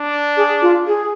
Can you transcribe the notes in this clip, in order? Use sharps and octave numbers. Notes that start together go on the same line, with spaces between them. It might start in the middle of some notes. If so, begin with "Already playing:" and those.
Already playing: D4
G#4
F4
G#4